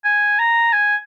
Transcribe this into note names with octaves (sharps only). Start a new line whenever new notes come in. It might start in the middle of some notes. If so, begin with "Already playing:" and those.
G#5
A#5
G#5